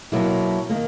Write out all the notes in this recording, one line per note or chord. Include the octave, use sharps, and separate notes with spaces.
B2 F#3 A#3 E4
D#3 A#3